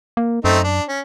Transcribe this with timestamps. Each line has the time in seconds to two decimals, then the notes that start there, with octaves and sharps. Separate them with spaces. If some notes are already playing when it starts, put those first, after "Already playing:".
0.17 A#3
0.44 F#2 A3 C4 D#4
0.64 D4
0.88 C#4